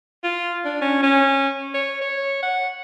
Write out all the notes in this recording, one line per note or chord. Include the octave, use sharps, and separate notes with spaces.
F4
D4
C#4
C#4
C#5
C#5
F#5